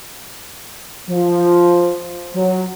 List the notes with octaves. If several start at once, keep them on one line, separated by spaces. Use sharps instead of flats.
F3
F#3